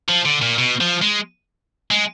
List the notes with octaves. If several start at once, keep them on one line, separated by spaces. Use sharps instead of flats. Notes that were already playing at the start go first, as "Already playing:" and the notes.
F3
D3
A#2
B2
F3
G#3
G#3